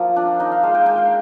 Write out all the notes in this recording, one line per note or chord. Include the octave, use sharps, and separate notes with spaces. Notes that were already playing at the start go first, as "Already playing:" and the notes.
Already playing: F3 A#3 F4 F5
D4
D#4 D#5
F5
G#3 F5
G5
G#3 G5
F5